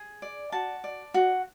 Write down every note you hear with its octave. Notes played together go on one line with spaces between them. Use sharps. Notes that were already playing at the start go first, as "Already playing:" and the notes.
Already playing: G#4
D5
F#4 A5
D5
F#4